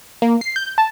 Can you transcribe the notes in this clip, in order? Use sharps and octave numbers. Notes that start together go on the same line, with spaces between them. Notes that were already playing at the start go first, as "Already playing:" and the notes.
A#3
C7
G6
A5